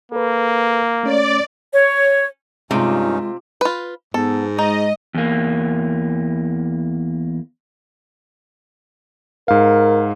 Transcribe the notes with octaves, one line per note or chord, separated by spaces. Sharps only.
A#3 A4 B4
A3 C#4 C#5 D5
C#5
G2 C3 G#3 C#4 D#4 F4
F4 B4
G#2 B3 A4
G#3 D#4 D#5
E2 A#3
G#2 A#4 F5